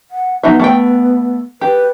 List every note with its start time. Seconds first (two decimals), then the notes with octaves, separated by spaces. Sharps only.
0.11 F#5
0.43 F#3 B3 D#4 E5
0.60 A3 G5
1.61 G4 B4